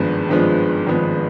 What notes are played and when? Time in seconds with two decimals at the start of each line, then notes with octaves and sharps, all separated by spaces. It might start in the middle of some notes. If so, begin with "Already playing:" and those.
Already playing: G#1 G2 F3 G#3 B3
0.28 G#1 G2 F3 G#3 B3
0.87 G#1 G2 F3 G#3 B3